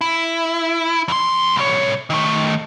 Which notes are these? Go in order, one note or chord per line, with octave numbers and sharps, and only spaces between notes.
E4
F2 C6
C2 C#5
D#3 A3